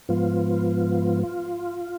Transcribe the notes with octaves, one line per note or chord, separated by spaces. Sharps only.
G#2 F3 B3 F4
F4